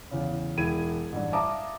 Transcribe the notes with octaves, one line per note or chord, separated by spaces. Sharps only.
E2 C#3
E1 E4 G#6 D#7
A1 G2
E5 F5 A5 A#5 D6 D#6